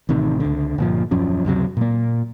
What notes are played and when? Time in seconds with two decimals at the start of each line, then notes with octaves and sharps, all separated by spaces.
0.09 A1 C3 D#3
0.40 C#2 D3
0.78 G1 A#2 F3
1.11 D#1 F#2 F3 C#4
1.45 C#2 F#2 C3 F#3
1.77 A#2 A#3